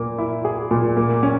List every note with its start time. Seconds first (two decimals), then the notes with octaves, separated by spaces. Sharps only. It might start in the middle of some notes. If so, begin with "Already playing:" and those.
Already playing: A#2 A#3
0.18 E4
0.45 G#4
0.71 A#2
0.97 A#3
1.23 C#4